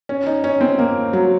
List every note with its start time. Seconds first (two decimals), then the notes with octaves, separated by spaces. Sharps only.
0.09 C#4
0.27 D#4
0.44 C#4
0.61 C4
0.79 A#3
1.13 F#3